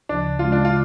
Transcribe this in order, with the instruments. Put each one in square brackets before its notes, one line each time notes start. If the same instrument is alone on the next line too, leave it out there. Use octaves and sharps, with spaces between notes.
[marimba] D2 C#3 F3 [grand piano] D4
[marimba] C#3 G#3 C#4 [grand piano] F4
[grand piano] D4
[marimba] C#3 [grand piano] F4